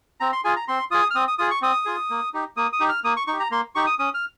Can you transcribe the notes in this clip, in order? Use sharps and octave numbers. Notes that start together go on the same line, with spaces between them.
C4 A#5
C6
F4 G#4 G#5
A#5
C4 C6
F4 G#4 D#6
F6
C4 D#6
D#6
F4 G#4 D#6
C#6
C4 D#6
F4 G#4
A#3
D#4 G4
A#3 D#6
D#6
D#4 G4
F6
A#3 D#6
C#6
D#4 C#6
G4
A#5
A#3 C6
D#4 G4 C#6
D#6
C#4 D#6
F6